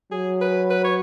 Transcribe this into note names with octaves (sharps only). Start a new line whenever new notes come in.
F#3 G#4
B4
B4
C#5